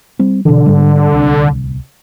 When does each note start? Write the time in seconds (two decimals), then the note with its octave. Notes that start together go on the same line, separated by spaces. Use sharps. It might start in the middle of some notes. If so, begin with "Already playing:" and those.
0.19 G3 C4
0.45 B2 D3 E3
0.66 G#2 G3
1.12 D1 C2